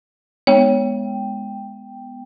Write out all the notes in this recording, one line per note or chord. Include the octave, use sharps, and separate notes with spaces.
G#3 B3 C#5 G5